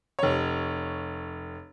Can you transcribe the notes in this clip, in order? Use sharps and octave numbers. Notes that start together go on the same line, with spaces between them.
F1 C#5